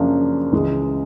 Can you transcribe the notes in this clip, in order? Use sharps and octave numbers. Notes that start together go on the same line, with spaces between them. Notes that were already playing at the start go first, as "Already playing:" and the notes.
Already playing: F#2 C#3 F3 A#3 D4
C#2 C#3 E3 G#3